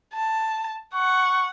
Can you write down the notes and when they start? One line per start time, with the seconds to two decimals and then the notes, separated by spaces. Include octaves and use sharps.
0.14 A5
0.94 F#5 C#6